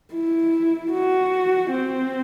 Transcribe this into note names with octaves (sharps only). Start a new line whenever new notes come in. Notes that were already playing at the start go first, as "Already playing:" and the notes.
E4
F#4
C4